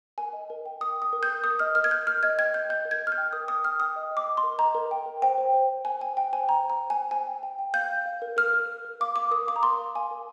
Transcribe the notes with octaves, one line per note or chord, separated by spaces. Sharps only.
A#4 G#5
D#5
A#4
G5
A#4 D#6
G5
D#6
A#4
G6
A#4
A#4 D#6
D#5 F6
A#4 F6
G#6
A#4 G6
A#4 F6
D#5 G#6
G5 G#6
D#5 G6
D#5 G6
A#4
G#6
D#5
F6
G6
G5
A#4 D#6
A#4 D#6
G5 F6
G5 D#6
D#5
D#5
D6
D#5
C6
A#4
D#5 A#5
A#4
G5
A#4
C5 G5
C5
C5
G5
C5 G#5
G5 G#5
G5
C5 G#5
G5 A#5
C5
A#5
C5
G#5
G5
C5 G#5
G5
G5
G5
F5 G6
F5
F5
A#4
A#4 F6
A#4
A#4
A#4
F5 D6
F5 D6
A#4 D#6
F5 D6
A#5
A#4 C6
F5
F5 G#5
A#4